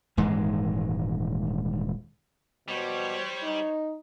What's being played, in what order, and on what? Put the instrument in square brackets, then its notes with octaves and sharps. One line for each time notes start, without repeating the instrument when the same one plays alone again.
[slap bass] D#1 G#2 E3 G#3
[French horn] B2 [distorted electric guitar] G3 [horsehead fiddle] C5 C#5
[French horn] D#4